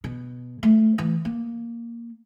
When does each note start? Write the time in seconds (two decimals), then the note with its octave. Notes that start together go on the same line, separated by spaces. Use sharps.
0.04 B2
0.63 A3
0.98 E3
1.25 A#3